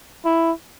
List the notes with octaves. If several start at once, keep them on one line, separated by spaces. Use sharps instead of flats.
E4